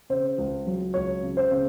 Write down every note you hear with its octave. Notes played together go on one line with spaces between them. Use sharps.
C#3 C5
C#2
F#3
C#2 C#5
C#3
C5
C#3